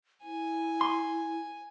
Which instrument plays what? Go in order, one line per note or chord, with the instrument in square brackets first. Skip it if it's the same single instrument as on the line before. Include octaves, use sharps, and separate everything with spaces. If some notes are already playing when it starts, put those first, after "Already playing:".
[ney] E4 [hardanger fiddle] G#5
[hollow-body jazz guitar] C6